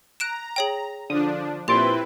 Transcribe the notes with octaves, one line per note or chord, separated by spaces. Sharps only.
A#5 F#6 D7 E7
G#4 C#5 G5
D3 F3 D4 D#6
A#2 C4 E4 G4 B4 C6 A6 D7